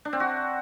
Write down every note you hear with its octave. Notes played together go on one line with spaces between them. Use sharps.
D4
C4
F#4